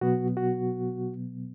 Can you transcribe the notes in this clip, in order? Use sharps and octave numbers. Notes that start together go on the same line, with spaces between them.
B2 F#3 B3 F#4
F#4